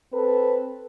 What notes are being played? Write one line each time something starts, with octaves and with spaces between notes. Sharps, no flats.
C4 A4 B4